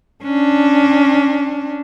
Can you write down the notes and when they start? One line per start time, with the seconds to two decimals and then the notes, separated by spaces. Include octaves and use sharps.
0.24 C#4 D4